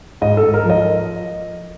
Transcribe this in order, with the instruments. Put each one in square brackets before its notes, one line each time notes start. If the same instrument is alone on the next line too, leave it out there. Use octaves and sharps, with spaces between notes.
[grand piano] G#2 D#5
A4
G#2
A#4
F3
D#5